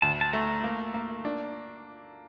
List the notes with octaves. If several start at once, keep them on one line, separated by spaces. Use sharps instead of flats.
D2 A5
A5
A3 A#5
A#3
A#3
D4